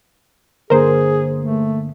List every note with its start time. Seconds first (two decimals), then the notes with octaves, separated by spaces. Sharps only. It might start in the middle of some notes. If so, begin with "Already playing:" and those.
0.70 G2 D3 A#3 G#4 A#4 C5
1.41 A3